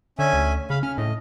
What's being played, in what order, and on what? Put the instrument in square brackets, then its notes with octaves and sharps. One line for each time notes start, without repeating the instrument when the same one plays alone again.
[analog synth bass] D3 [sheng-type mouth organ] C#4 E5 G#5
[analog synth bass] D2
[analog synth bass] C#3 [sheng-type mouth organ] F5 B5
[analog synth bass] C#4 [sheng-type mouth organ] F6
[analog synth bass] A2 [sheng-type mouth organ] D#5